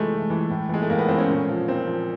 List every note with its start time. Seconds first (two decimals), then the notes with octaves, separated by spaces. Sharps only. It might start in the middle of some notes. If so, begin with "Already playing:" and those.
Already playing: C3 E3 G#3 A3
0.11 C3
0.30 E3
0.50 A2
0.69 E3 G#3
0.82 A3
0.90 A2 A#3
0.99 B3
1.08 E3 C4
1.18 C#4
1.29 A#2
1.49 F3
1.68 A#2 C4
1.87 F3